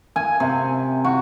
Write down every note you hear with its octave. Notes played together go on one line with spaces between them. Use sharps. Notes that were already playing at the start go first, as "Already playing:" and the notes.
G#5
C3
F#4